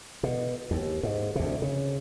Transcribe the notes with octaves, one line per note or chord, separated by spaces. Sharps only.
B2
D#2
G#2
D2 C3
C#3